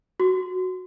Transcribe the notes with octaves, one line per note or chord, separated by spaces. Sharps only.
F#4